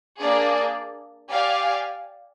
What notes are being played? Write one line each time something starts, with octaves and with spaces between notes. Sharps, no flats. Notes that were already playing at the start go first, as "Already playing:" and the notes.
A#3 D4 G#4 D5
G4 D5 F5 G#5